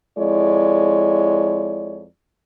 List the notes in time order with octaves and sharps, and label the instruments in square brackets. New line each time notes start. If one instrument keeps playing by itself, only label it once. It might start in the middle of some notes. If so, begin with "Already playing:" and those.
[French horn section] F2 G#3 E4 C#5 D5